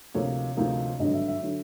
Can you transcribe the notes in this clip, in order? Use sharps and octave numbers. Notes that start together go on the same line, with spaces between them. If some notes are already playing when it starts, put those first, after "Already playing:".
D2 C3 F3 A#3 D#4 C#5
D2 C3 F3 A#3 D#4
G#1 G2 D3 F#3 D#5
E5
E5
D3 F#3